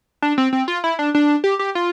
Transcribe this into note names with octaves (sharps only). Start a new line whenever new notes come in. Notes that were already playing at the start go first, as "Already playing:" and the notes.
D4
C4
C4
F4
E4
D4
D4
G4
G4
F4